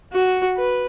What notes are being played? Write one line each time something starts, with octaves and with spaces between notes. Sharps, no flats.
F#4
B4